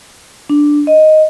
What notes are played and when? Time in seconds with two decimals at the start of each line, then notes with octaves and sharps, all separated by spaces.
0.50 D4
0.87 D#5